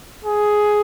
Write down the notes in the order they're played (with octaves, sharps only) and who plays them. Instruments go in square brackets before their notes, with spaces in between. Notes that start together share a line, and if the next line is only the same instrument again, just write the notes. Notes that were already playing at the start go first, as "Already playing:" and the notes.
[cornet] G#4